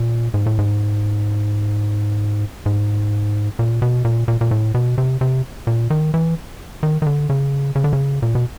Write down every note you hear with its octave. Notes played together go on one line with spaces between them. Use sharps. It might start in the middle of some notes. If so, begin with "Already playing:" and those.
Already playing: A#2
G#2
A2
G#2
G#2
A#2
B2
A#2
A#2
A#2
A2
B2
C3
C3
A#2
D#3
E3
D#3
D#3
D3
C#3
C#3
D3
C#3
A#2
B2